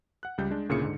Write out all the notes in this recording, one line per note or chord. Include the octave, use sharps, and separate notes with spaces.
F#5 F#6
C#2 G3 G6
G#3 D4
D2 A#2 C#3 E4 G#4 C#7
G#2 D3